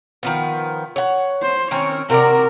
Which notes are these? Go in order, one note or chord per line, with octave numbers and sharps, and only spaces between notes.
D#3 F3 B3
C#5 F#5
C5
D#3 C4 C#4 C#5
C3 F#4 A#4 D5